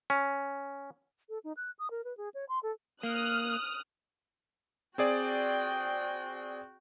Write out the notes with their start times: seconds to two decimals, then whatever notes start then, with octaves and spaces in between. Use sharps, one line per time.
0.10 C#4
1.29 A4
1.44 D#4
1.57 F#6
1.79 D#6
1.91 A#4
2.04 B4
2.17 G#4
2.34 C#5
2.49 C6
2.63 A4
3.03 A#3 D#6 F6 F#6
4.98 C4 F#4 G#4 D5 G5